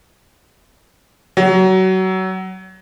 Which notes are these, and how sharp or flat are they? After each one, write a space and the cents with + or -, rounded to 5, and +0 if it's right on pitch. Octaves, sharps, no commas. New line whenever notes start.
F#3 +25